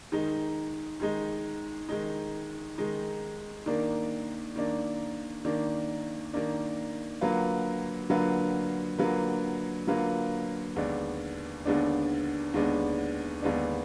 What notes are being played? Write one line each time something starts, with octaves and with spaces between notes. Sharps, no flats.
D#3 G#3 D#4
D#3 G#3 D#4
D#3 G#3 D#4
D#3 G#3 D#4
D#3 A#3 D4
D#3 A#3 D4
D#3 A#3 D4
D#3 A#3 D4
D3 F#3 A#3 F4 B4
D3 F#3 A#3 F4 B4
D3 F#3 A#3 F4 B4
D3 F#3 A#3 F4 B4
D#2 D3 G#3 B3 D4
D#2 D3 G#3 B3 D4
D#2 D3 G#3 B3 D4
D#2 D3 G#3 B3 D4